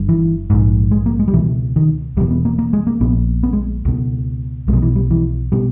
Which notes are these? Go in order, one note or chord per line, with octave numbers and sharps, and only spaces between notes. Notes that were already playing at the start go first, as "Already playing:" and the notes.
Already playing: G1 G2
E3
A#1 G#2
G#3
A#3
G#3
G3
C#2 B2 E3
D#3
E1 E2 B2 G3
B3
A#3
A#3
G#3
A#3
A#1 A#2 B3
B3
G#3
C#2 B2
B1 B2 G3 G#3
E3
G3
E3
B2 G3